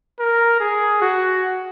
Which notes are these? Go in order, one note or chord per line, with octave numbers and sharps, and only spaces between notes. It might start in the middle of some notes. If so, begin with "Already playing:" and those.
A#4
G#4
F#4